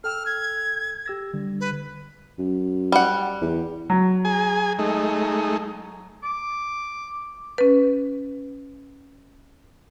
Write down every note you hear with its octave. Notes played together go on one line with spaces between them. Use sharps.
A4 G5 E6 F6
G#6
G4 E6 A#6
D3 G3
B4
F#2
G3 F#5
E2
F#3
G#4 G#5
G#3 A3 D#4
D6
C#4 B4